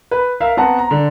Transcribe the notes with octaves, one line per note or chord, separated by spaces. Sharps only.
B4
A#4 E5 F5
B3 C4 F#5 A5 A#5
A#5
D3